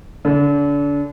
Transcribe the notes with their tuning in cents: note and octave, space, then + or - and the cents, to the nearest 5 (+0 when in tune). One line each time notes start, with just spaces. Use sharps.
D3 -35